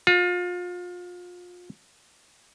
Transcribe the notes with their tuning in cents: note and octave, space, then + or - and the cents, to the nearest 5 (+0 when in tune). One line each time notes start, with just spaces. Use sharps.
F4 +30